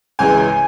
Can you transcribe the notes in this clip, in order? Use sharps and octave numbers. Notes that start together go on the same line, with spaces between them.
C#2 C#3 E3 G#3 G#5